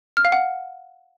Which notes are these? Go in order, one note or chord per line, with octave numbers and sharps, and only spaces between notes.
F6
F5
F#5